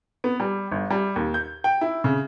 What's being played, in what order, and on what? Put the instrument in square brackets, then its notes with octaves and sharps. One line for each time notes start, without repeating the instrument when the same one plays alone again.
[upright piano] B3
G3
G1
G3
D#2
G6
G5
E4
C#3